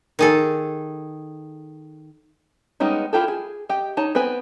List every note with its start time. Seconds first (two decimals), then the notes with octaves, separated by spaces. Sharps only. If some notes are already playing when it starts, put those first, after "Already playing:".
0.19 D#3 G#4 A4
2.80 G3 G#3 B3 C#4 D#4
3.13 E4 F4 G4 A4
3.28 G#4
3.69 G4 D#5 G5
3.97 D#4 C#5 A5
4.15 B3 C4 B4 G#5